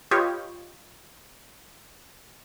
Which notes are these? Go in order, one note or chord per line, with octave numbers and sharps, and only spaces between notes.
F4 G4 B4 C#5 D#5 G5